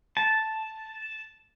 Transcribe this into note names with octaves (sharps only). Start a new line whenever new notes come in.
A5